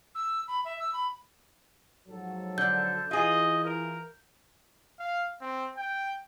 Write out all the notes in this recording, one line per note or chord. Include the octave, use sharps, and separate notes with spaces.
E6
B5
E5
E6
B5
G#2 F3 F#3 A4
D3 G6
E3 F4 G#4 D#5
A#4
F5
C4
G5